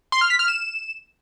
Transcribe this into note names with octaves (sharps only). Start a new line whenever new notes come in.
C6
F6
B6
F6
E7